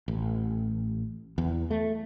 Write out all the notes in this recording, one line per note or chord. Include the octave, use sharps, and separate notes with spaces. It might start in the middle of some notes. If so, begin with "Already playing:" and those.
A1
E2
A3